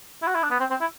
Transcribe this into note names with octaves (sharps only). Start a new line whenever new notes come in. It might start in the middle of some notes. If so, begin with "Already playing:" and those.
E4
F#4
E4
D4
B3
C4
C4
E4